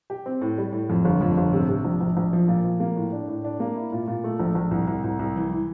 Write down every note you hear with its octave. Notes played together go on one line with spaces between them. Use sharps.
G4
C4
A2
G3
A2
F2
G1
F2
G1
C3
C3
A#1
A#1
A#1
F3
A#2
F3
A#3
A2
D4
A2
D4
A#3
E4
A#2
A#2
A3
A#1
A#1
C2
C2
C2
C2
E3
E3